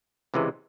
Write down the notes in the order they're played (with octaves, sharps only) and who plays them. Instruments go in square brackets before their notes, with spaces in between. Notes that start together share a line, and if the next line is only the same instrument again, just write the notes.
[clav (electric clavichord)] C#2 C3 E3 G#3